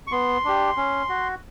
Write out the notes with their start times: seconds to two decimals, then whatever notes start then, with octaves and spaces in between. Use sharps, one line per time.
0.07 C#6
0.12 B3 C6
0.45 D4 G4
0.77 C#4
1.09 F#4